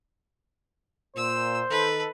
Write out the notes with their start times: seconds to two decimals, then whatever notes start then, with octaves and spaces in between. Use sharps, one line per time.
1.16 A#2 C5 E6
1.70 D#3 D#4 A4 B4